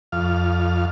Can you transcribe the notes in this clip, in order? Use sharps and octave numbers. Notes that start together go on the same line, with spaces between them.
F2 F5